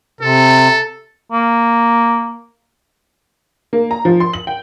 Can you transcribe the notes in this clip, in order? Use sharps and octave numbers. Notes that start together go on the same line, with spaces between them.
C3 A4
A#3
A#3
A#5
F3
C6
F#7
G5